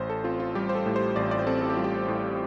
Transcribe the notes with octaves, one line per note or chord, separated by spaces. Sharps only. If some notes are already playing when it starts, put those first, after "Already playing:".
Already playing: A1 C5
A4
C4 F4
F4
G3 G4
C5
A4
A2
C5
A1 D5
D5
C5
C4 A4
A4
G4
G3 F4
G4
A2